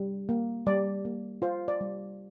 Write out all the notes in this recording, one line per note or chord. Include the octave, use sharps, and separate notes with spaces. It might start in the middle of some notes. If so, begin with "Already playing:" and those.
Already playing: G3
A#3
G3 D5
A#3
F4 C5
D5
G3